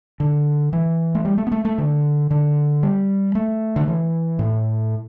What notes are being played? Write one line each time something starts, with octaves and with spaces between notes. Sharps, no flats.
D3
E3
A3
G3
A3
B3
A3
A3
D3
D3
G3
A3
D3
E3
A2